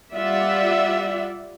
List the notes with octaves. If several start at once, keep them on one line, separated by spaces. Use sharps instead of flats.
G3 F4 D5 E5 F#5